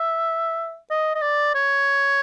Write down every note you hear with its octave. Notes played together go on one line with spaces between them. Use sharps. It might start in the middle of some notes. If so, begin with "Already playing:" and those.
Already playing: E5
D#5
D#5
D5
C#5